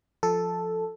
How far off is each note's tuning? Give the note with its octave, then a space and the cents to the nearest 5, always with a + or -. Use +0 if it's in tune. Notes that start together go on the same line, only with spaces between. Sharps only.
F3 +0 A4 +0